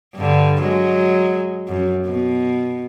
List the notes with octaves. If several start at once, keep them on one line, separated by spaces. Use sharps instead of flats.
G2 D3
F#3 G#3
F#2
B2